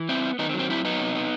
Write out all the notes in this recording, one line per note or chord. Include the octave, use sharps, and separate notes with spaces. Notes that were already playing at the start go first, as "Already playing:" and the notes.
Already playing: E3
B3 C4 E4
B3
D#3 B3 D#4
C4
F#3
C4
F#2 C4 E4
F#3 B3 D#4
C3
B3